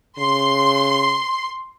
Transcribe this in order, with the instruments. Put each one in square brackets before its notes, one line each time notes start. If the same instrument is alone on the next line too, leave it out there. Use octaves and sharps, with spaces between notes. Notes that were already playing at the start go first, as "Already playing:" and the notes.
[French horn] C#3 [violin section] C6